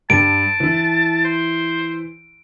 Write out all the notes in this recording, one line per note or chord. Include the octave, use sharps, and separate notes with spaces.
G2 A5 D7
E3 E4
C5